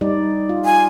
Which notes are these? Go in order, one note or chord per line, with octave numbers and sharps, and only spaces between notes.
G3 D#4 D5
F4
G#5